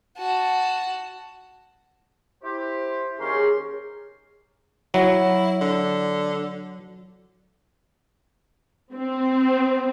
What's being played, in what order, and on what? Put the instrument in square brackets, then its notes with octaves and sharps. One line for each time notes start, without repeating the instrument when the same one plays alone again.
[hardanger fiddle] F#4 A5
[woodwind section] E4 G4 [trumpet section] C5
[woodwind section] D#2 G4 C6 [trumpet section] C#4 A#4 C#5 [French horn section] G#4
[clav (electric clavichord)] F#3 [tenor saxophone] E4
[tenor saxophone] D3
[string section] C4